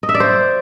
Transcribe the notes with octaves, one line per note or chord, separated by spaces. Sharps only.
D#5
E5
D5
C5